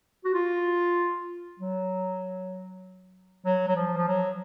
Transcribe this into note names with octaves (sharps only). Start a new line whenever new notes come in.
F#4
F4
F#3
F#3
F#3
F3
F3
F#3